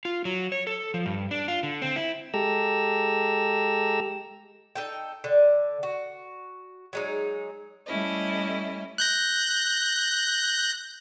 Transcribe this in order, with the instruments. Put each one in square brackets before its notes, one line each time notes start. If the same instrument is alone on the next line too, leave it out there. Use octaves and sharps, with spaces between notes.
[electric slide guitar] F4
F#3
C#5
A4
F3
G2
D4
F4
D3
C4
E4
[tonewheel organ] G#3 G4 A4 A#5 E6
[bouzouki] D#4 A4 G5
D3
F#4
F#3 G#3 D#4
[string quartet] G3 A3 C#4 E4 D#5
[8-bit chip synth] F#6 G6 A#6